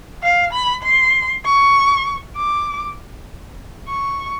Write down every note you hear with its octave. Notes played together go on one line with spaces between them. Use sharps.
F5
B5
C6
C#6
D6
C#6